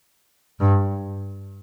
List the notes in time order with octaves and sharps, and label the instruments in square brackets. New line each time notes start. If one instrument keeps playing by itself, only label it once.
[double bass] G2